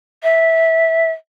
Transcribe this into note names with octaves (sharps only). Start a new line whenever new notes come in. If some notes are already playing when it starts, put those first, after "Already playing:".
E5